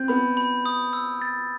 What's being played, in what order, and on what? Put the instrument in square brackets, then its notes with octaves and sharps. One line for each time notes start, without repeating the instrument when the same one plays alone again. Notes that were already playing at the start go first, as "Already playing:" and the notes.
Already playing: [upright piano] C4 [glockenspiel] G6
[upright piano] B3 [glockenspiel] B5
[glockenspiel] B5
D#6
E6
A6